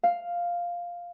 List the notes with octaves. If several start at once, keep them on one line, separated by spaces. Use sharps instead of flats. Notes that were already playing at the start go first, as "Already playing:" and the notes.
F5